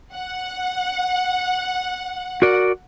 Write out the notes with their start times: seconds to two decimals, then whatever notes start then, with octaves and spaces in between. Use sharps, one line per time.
0.14 F#5
2.42 F#4 A#4 D5